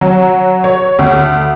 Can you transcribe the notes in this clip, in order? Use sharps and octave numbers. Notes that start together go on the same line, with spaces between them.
F#3
C#5
D2